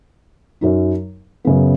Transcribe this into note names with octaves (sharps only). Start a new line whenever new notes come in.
F#2 F#3 D#4
F#2 C#3 B3